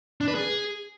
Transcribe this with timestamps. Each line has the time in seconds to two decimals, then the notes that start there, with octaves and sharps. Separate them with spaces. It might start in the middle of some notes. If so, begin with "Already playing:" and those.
0.21 D4
0.28 B4
0.35 G#4